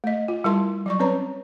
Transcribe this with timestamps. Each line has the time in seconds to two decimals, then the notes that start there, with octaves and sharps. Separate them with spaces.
0.04 A3 D#5
0.28 F4
0.44 G3 E4 A#4 A5 C6
0.86 F#3 D5 C#6
0.99 C4 C#4 B4 C#5 A#5